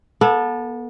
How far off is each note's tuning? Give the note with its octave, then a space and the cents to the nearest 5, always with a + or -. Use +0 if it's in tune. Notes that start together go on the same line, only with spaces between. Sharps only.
B3 -35 A4 +0